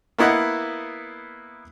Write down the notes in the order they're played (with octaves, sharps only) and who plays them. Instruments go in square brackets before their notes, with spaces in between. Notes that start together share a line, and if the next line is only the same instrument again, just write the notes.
[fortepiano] A#3 B3 E4 D#5 F#5